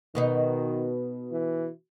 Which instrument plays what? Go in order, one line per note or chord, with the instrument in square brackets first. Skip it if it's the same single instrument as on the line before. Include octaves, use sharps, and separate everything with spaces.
[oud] B2 B3 D#4 [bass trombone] D#3
[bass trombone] E3